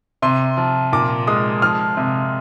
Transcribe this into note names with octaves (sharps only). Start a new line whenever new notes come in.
C3 C6
F3
A#2 D6
G#3 D#6
F3 F6
C3